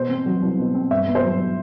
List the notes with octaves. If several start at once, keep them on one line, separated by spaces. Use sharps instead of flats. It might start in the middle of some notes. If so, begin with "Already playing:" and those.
Already playing: B2 C5
C4
F#3
C2
B2
C4
G2 E5
B3
C5
F#3